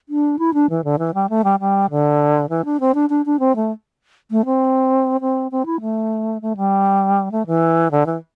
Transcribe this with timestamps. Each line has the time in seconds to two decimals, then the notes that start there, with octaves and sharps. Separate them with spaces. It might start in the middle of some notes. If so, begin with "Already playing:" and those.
0.09 D4
0.39 E4
0.54 D4
0.70 E3
0.84 D3
0.99 E3
1.14 G3
1.29 A3
1.44 G3
1.60 G3
1.90 D3
2.49 E3
2.65 D4
2.80 C4
2.94 D4
3.10 D4
3.26 D4
3.40 C4
3.56 A3
4.31 A3
4.45 C4
5.21 C4
5.51 C4
5.66 E4
5.81 A3
6.42 A3
6.57 G3
7.32 A3
7.47 E3
7.91 D3
8.06 E3